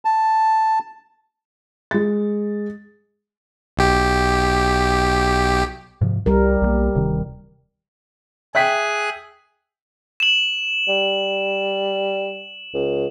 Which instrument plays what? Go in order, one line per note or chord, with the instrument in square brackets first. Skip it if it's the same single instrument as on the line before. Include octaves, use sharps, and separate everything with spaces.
[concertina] A5
[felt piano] G#3 A6
[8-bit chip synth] B1 G4
[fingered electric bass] G#2 C3 F3
[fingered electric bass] C2 [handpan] G3 A#4
[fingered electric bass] B1 F3 A#3
D1 C3 D#3
[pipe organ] G#4 F#6 [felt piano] E5 G5 B6
[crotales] E7 F#7
[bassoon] G3
C#2